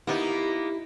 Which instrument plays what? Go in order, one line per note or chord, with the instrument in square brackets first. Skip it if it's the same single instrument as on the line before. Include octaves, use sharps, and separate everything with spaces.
[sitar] A#3 B3 D#4 [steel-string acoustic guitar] E4 [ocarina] G4